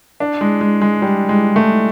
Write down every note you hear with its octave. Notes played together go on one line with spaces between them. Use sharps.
D4
G#3
G#3
G#3
G3
G#3
A3